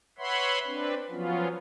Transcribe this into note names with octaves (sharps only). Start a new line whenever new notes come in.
B4 C#5 E5 F#5 B5 C6
C4 D4 B4
F3 F#3 B3 C#4 F4